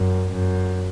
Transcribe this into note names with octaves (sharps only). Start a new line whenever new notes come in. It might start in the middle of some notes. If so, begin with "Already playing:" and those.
Already playing: F#2
F#2